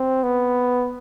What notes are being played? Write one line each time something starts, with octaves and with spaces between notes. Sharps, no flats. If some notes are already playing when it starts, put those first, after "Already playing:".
Already playing: C4
B3